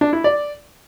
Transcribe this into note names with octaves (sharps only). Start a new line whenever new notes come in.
D4
E4
D5